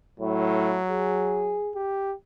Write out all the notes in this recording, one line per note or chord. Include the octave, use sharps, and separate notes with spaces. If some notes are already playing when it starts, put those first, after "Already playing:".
A2 F#3
G#4
G4